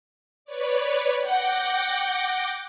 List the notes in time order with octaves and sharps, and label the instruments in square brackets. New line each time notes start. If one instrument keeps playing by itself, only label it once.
[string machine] B4 C#5 D5
[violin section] F#5 G5 [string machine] D6 G6 A#6